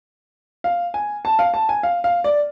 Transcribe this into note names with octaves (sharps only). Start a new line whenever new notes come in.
F5
G#5
A5
F5
A5
G#5
F5
F5
D5